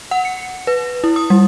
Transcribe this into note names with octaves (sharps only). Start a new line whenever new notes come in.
F#5
C#7
B4
E4
D#6
G3